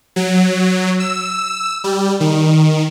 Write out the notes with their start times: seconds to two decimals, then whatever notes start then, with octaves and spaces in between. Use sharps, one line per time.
0.16 F#3
1.00 E6
1.84 G3
2.20 D#3